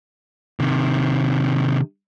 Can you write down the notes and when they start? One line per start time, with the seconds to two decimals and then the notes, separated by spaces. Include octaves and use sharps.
0.60 C3 D#3